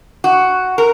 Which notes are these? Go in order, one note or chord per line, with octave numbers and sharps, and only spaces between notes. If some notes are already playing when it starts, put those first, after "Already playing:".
F#4
A#4